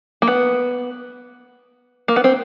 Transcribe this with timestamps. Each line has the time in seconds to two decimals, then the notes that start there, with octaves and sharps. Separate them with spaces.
0.22 A#3
0.28 B3
2.08 A#3
2.16 B3
2.24 C4